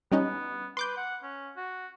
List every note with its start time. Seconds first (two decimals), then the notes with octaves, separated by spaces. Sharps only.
0.12 G3 B3 C#4 D#4
0.77 B4 C6 D6 G6
0.97 F#5
1.23 C#4
1.57 F#4